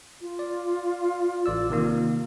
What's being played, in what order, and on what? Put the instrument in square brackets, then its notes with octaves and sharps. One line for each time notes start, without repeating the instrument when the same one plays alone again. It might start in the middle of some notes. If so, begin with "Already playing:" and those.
[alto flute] F4
[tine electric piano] D5
A1 D5 E6
C3 D#3 A#3